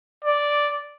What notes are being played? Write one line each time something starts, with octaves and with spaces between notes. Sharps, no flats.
D5